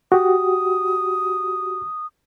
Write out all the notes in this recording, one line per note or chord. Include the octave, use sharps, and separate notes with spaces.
F#4 G4 D#6